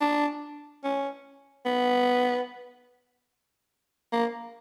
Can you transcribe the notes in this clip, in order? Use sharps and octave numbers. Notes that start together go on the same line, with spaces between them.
D4
C#4
B3
A#3